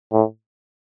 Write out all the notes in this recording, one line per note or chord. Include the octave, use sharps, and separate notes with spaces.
A2